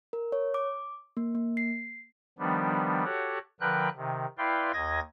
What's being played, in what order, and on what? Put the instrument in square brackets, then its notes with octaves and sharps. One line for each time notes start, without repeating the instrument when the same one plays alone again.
[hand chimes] A#4
C#5
D6
A#3
A#3
C7
[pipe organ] D#3 F3 G3 B3 D4
F#4 G4 A4 C#5 F#5
D3 F3 A#4 B4 G5 F#6
C3 D#3
E4 B4 D5 F5 G5 C6
D#2 D#5 G#6 A#6